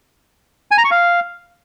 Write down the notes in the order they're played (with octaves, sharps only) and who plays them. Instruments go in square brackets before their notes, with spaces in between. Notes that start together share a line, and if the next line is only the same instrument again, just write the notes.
[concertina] G#5
A#5
C#6
F5